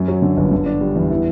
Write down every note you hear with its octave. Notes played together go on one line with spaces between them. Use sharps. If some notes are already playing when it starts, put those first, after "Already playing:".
Already playing: F#2
F#3
D3
G1
D3
D4
G3
E2
E3